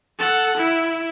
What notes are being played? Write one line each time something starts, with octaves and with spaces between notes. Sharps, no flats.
A4 F#5
E4